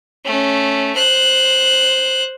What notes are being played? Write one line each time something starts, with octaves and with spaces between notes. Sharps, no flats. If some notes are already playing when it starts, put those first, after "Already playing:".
A3 C#4
C5 F#6